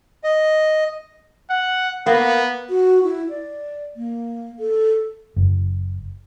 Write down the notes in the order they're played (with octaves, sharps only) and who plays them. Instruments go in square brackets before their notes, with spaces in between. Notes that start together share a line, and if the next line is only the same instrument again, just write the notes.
[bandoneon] D#5
[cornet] F#5
[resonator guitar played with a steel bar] A#3 [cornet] B3
[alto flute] F#4
E4
D5
A#3
A4
[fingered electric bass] F#1